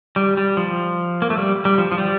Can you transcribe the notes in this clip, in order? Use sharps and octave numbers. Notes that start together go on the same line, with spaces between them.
G3
G3
F3
A#3
A3
G3
G3
F3
F3
G3